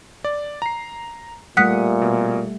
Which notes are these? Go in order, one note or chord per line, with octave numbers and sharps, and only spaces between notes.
D5
A#5 C7
A#2 G3 A3 F#5 D#6 F#6 B6 C#7
B2